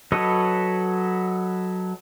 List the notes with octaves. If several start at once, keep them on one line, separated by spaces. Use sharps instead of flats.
F#3 A4 B4 C#5 D#5